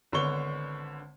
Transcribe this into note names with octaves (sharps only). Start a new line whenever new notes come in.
G#1 D3 B3 C#5 C#6 G7